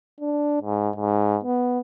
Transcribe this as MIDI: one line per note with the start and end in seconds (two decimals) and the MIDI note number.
0.20 0.60 62
0.62 0.90 44
0.96 1.38 44
1.44 1.79 59